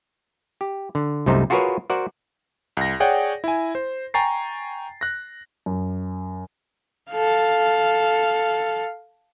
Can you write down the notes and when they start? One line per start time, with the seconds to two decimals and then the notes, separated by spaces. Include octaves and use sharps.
0.61 G4
0.95 D3
1.26 C2 F#2 C3 A3 D#4 C5
1.50 F4 F#4 G#4 A#4 B4 C#5
1.90 F#4 A#4 C5 D5 F#5
2.77 C2 A#6
3.00 G#4 C#5 D5 F#5 G5
3.44 E4 G#5
3.75 C5
4.14 G5 G#5 A#5 C#6 A6 C7
5.01 F#6 A#6
5.66 F#2
7.11 A4 F5